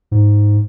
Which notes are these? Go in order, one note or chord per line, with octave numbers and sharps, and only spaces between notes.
G#2